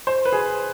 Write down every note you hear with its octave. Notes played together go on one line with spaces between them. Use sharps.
C5
B4
G#4